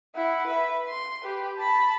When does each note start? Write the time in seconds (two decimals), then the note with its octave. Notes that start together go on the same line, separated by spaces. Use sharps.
0.15 E4 F#5
0.47 B4 E5
0.88 C6
1.22 G4 B4
1.57 A5 B5